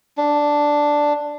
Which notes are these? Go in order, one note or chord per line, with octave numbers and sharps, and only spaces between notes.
D4